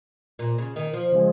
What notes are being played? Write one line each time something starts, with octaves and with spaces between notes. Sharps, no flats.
A#2
C#3
D#3
F3
C#3 F3 G#3